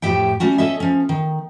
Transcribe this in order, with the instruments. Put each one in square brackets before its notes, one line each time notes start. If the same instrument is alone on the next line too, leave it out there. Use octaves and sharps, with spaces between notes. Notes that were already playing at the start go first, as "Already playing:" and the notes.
[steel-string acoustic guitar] F2 A2 G4 E5 G5
G3 A3 C#4 F#4
C#4 A4 D#5 E5
F3 C#4
D#3